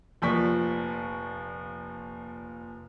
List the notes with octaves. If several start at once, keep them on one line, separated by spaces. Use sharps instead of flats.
F1 A#2 F3 D5 C#6 B6